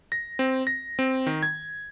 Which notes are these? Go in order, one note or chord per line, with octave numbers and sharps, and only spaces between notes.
A#6
C4
A#6
C4
D#3
G#6